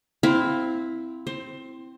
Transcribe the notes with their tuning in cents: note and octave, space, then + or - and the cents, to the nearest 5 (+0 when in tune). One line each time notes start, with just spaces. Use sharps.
C4 -10 E4 +0 F5 +15
C4 -5 C5 +20